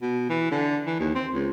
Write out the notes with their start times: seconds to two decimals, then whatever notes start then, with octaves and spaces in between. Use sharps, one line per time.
0.02 B2
0.29 E3
0.51 D3
0.86 E3
1.00 D#2
1.15 C4
1.33 C#2